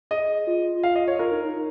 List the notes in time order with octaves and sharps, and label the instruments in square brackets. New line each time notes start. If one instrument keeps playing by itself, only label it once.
[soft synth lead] G#4 [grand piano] D#5
[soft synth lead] F4
[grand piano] F5
D#5
C#5
[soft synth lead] F4 [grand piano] A#4
[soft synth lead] D#4
D#4
D#4